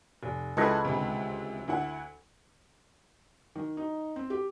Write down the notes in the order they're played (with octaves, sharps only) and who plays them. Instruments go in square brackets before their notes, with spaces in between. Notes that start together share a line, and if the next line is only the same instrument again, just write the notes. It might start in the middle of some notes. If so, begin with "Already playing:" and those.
[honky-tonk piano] F1
[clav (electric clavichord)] C#2 B4 D#5 [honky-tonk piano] E4 G#4 A4
[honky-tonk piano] D2 C3
D2 E4 F#5
[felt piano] D#3
D#4
C4
G4